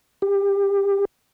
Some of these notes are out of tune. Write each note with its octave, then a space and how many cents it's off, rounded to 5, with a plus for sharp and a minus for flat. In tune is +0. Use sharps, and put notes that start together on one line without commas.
G4 +25